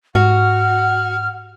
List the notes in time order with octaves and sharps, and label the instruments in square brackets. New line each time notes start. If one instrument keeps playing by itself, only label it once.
[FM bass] G#2 [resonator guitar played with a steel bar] F#4 [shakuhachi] F#5 [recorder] F6